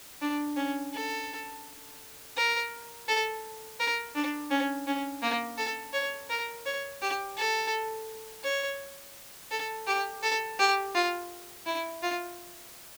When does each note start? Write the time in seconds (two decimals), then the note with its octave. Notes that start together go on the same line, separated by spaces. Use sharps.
0.22 D4
0.57 C#4
0.93 A4
2.37 A#4
3.08 A4
3.80 A#4
4.15 D4
4.51 C#4
4.87 C#4
5.22 A#3
5.58 A4
5.93 C#5
6.30 A#4
6.66 C#5
7.02 G4
7.37 A4
8.44 C#5
9.51 A4
9.87 G4
10.23 A4
10.59 G4
10.95 F4
11.66 E4
12.03 F4